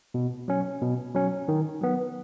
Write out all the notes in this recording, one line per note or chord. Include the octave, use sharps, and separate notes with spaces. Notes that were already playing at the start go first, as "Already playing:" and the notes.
B2
F#3 C#4
B2
F#3 C#4
D#3
F#3 B3